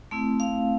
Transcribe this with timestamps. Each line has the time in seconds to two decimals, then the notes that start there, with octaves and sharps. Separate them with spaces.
0.11 A3 C4 E4
0.40 F5